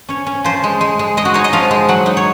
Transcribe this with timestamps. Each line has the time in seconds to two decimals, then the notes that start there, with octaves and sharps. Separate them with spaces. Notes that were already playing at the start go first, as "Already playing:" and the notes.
0.09 C#4 C#5
0.26 C#4
0.44 F3 C5
0.64 G#3
0.81 G#3
0.99 G#3
1.17 G#3 D#5
1.25 F#4
1.34 D#4 C#5
1.44 D#5
1.53 F3 F5
1.71 G#3
1.89 F#3 F#5
2.06 D#4
2.17 C#5